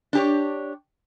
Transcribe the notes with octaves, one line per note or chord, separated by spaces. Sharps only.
D4 G4 C#5